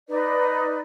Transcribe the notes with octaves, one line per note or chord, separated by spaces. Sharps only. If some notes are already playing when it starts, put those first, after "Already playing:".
D#4 B4 D5